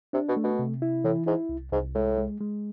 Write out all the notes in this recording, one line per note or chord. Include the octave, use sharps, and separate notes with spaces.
C3 D4
B2
A3
B2
C3
E4
A2 E3
G#2 E4
C2
C2 G#2
A2 G#3
G#3
G#3